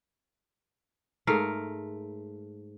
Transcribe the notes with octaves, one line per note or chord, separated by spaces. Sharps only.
G#2 A3 A#4 F5